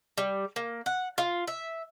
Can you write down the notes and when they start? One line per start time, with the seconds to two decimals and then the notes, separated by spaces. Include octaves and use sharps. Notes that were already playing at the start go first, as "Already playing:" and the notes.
0.18 G3
0.56 A#3
0.86 F#5
1.18 F4
1.47 E5